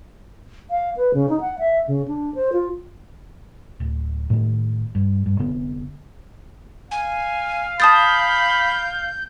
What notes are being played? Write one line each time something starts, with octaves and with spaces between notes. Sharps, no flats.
F5
B4
C#3
D#4
F#5
E5
C#3
D4
C5
F4
D1
A2 D#3
G2
G2
F1 D3 B3 C4
F5 G#5
A5 B5 D#6 G6 A6